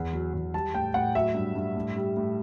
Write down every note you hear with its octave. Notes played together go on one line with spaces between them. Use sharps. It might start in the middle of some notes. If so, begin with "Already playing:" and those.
Already playing: E2
F#3
E2
G3 A5
A2 G5
A2 F#5
F#3 E5
G2
G2
A2
G3
A2